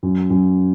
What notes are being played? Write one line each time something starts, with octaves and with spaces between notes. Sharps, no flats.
F#2
F#2